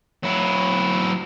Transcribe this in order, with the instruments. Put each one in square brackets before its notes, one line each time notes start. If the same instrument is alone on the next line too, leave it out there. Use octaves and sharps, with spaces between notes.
[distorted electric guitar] F#3 E4